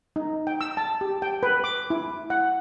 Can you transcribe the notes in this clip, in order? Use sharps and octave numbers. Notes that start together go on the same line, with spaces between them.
D#4
G5
E6
A5
G4
G5
B4
D6
E4
F#5